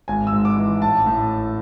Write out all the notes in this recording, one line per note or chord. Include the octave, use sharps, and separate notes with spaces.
G#1 G#5
E6
G#2
D6
E3
A1 A5
A2